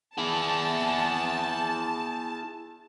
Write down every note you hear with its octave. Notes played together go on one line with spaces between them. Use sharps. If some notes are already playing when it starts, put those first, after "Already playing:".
E4 G#4 A5